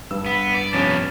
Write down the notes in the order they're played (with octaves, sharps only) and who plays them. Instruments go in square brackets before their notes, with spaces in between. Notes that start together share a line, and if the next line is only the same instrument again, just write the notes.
[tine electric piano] G2 [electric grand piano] E6
[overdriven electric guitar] B3
D5
[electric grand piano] C3 C#4 A6 [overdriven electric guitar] F3 B3